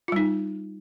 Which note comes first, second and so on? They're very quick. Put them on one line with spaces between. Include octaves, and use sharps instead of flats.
F4 G3 D#4